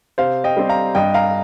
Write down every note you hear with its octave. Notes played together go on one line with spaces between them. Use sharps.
C3 C5 F5
D#5 G5
G3 C4
F5 A#5
G2 D#5 G5
F5 A#5